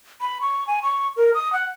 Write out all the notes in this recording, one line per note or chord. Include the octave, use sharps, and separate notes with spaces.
B5
C#6
G#5
C#6
A#4
D#6
F#5